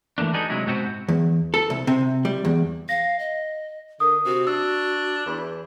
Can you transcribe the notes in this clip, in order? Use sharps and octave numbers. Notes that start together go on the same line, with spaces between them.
E3 A3 A#3 D4
D4 D#4 F#4 G#4 A4 B4
C3 F#3 G#3 E4
G#2 B2 B3 C4 F4 F#4
E2
A4
C2
C3
G3
E2
F5 A#6
D#5
D3 A#4 D#6
C3 F#4
D4 E6
E2